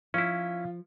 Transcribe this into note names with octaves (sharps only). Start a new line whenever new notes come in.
F3 C#4 E4 F4